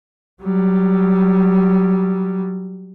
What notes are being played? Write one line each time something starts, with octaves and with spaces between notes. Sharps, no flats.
F#3 G3